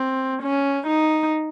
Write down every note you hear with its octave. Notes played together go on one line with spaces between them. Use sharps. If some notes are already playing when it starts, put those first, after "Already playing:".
Already playing: C4
C#4
D#4